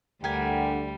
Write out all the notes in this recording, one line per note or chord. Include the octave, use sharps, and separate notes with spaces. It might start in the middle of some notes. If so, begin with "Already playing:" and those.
D2 D3 G3 G4 A#4 F#5 G#5